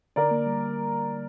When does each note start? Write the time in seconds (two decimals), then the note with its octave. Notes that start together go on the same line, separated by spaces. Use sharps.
0.16 D3 A#4 D5
0.31 A#3
0.46 G3